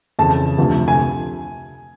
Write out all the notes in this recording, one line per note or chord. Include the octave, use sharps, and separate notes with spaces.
F2 C#3 E3 A5
D2 C3 F3
G#5